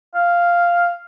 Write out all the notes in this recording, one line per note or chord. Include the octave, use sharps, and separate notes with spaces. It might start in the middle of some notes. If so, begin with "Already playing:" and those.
F5